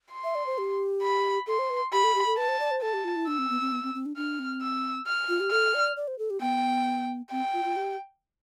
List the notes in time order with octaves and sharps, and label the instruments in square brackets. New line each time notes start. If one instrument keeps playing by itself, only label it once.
[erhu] C6
[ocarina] E5
D5
C5
G4
[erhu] B5
[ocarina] A4 [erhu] C6
[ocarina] C5
B4
[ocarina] G4 [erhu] B5
[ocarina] A4
G4
A4
[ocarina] B4 [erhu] A5
[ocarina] C5
D5
C5
[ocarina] A4 [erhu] A5
[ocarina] G4
F4
E4
[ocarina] D4 [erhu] E6
[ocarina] C4
B3
C4
B3
C4
C4
D4
[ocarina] D4 [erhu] F6
[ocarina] C4
[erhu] E6
F6
[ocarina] F4
G4
[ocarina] A4 [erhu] F6
[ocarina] D5
D5
C5
A4
G4
[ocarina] B3 [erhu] G5
[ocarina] C4 [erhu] G5
[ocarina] F4
F4
G4